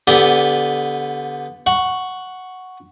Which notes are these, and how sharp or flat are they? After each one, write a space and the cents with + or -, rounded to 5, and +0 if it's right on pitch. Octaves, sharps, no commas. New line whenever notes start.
D3 -15 B3 +0 G4 +0
F#5 +0 C#6 +0